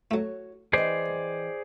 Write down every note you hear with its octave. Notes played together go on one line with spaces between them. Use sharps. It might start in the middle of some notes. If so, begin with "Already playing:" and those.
F#3 A3 F#4 C#5
E3 G#4 C5 D5 D#5 G5